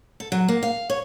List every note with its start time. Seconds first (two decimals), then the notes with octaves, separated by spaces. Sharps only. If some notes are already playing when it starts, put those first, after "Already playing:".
0.20 A4
0.32 F#3
0.48 A#3
0.63 F5
0.90 C#5